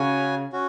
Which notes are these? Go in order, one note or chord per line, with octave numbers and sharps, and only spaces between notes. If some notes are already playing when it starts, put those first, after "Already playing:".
Already playing: C#3 F#4 C#5 G#5
C#4 F#4